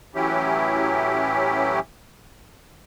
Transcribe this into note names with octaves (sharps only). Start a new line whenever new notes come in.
A2 E3 F#3 C#4 E4 G4